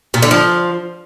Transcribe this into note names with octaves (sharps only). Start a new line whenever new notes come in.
A#2
D3
F3